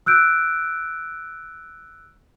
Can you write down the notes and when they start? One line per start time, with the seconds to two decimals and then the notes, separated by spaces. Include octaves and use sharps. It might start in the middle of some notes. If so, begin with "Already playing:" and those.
0.06 E6 F#6 G6 D7